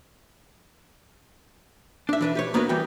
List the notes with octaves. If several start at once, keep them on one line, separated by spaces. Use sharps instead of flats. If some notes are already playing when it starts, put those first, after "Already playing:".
D4 E5
E3 D4 B4
G4 B4 C#5
A#3 B3 D4 F#4 A#4 B4
E3 G3 B4 G5